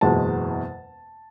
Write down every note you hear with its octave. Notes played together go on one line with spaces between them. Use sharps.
F#1 E2 B2 G#3 A5